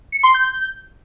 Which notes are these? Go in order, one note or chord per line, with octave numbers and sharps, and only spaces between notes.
C#7
C6
G6